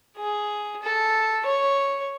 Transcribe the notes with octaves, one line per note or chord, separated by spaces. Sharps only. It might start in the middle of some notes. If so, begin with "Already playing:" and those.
G#4
A4
C#5